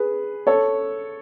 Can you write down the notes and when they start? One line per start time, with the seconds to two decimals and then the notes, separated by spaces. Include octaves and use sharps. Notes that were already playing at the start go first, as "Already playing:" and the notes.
Already playing: G#4 B4
0.47 A4 C#5